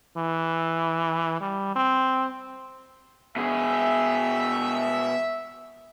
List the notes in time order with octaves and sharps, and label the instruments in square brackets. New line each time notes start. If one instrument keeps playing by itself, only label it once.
[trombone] E3
G3
C4
[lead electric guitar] B2 G#4 [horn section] E5